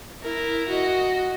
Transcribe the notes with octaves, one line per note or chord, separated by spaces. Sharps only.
E4 A#4
F#4 D#5